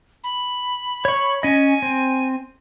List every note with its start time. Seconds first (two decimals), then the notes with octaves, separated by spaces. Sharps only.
0.24 B5
1.05 C#5 C#6
1.43 C#4 D#5 G#5
1.82 C4